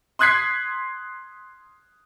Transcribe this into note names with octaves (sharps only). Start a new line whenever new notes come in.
C6 D#6 F#6 G#6 B6 C7